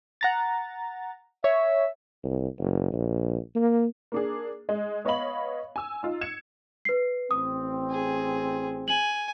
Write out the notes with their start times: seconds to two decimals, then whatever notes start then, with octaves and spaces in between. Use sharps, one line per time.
0.21 F#5 A#5 A6
1.44 C#5 E5
2.24 C2
2.59 F#1
2.92 A#1
3.56 A#3
4.12 A#3 D4 G#4
4.69 G#3
5.05 B3 C#5 D#5 F5 B5 F#7
5.76 G#5 E6
6.03 D#4 F4
6.21 G#6 C#7 E7
6.85 B4 C7
7.31 A1 C4 D#6
7.91 G#4
8.88 G#5 F#7